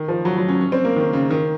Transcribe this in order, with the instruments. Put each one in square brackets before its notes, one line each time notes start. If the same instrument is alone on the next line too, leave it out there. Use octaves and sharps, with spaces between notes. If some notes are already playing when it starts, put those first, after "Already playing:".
Already playing: [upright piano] D#3
F3
F#3
F#3
C#4
C#4
C4
A#3
D#3
C#3
D#3